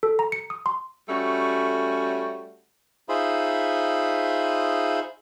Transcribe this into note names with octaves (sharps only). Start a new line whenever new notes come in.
A4
A#5
C#7
D#6
C6
G3 A3 C#4 F#4
D#4 F4 G#4 C5 E5 B5